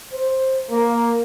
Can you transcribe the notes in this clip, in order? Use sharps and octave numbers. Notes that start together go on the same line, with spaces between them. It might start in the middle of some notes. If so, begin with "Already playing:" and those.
C5
A#3